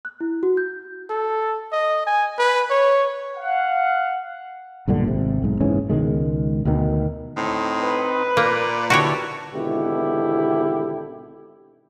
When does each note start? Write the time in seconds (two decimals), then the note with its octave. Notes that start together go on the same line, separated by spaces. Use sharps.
0.05 F#6
0.21 E4
0.43 F#4
0.57 G6
1.10 A4
1.72 D#5
2.07 G#5
2.39 B4
2.70 C#5
3.38 F5 F#5
4.88 B1 G2 A#2 D3
5.07 G#1 C3
5.42 B1 G#2
5.60 F#1 G#2 E3 C#4
5.89 C#2 B2 D#3 G#3
6.65 D2 B2 D#3
7.37 A2 C4 D#4
7.83 B4
8.37 A#2 A#3 D5
8.90 D3 E4 F#4 G4 A4 C#5
9.53 G#1 B2 D3 E3 E4 G4